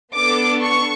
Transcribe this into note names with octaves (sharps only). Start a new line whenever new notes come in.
B3 D4 A4 D6
C#6